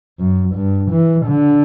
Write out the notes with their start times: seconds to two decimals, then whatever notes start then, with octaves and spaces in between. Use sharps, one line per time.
0.20 F#2
0.55 G2
0.91 E3
1.26 D3